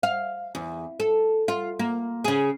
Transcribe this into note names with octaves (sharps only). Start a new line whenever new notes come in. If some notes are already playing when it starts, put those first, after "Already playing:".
F5
E2
A4
F4
A#3
C#3 G#4